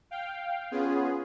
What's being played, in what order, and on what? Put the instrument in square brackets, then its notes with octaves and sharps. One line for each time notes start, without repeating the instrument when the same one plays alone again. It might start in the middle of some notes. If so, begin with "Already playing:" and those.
[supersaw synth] F5 G5
B3 C#4 F4 G#4